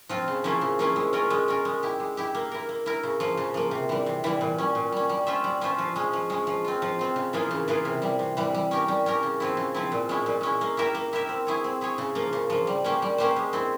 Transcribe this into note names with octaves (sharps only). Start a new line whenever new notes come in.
F3 C4 F4
C#3
F3 A#3 C#4 E4
C#3
F3 A#3 C#4 E4
G#3
C#4 F4 A#4
G#3
C#4 F4 A#4
G#3
E4 G4
G#3
E4 G4
A#3
E4 A#4
A#3
E4 A#4
C#3
F3 A#3
C#3
F3 A#3
C3
E3 G3
C3
E3 G3
A#2
G3 C#4
A#2
G3 C#4
G3
C#4 F4 C5 E5
G3
C#4 F4 C5 E5
F3
G#3 C#4
F3
G#3 C#4
F3
C4 F4
F3
C4 F4
C#3
E3 A#3 F4 G#4
C#3
E3 A#3 F4 G#4
C3
E3 G3
C3
E3 G3
G3
C#4 G4 A#4
G3
C#4 G4 A#4
C#3
F3 C4 E4
C#3
F3 C4 E4
A#2
G#3 C#4 E4
A#2
G#3 C#4 E4
A#3
E4 G4 A#4 E5
A#3
E4 G4 A#4 E5
C4
E4 G#4 C#5
C4
E4 G#4 C#5
C#3
F3 A#3
C#3
F3 A#3
G3
A#3 C#4 G4 C5
G3
A#3 C#4 G4 C5
G#3
C4 E4